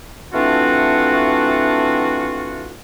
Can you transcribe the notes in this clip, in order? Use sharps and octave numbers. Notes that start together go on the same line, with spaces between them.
E3 A3 C4 D4 F4 F#4